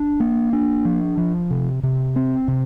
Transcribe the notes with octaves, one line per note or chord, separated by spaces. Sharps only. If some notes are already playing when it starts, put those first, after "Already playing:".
Already playing: D4
A#3
D4
F3
F3
C3
C3
C4
C3